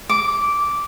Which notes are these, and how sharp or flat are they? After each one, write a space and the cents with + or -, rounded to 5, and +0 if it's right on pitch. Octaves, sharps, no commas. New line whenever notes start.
D6 -10